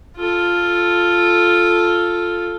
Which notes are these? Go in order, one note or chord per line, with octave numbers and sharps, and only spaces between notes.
F4 A4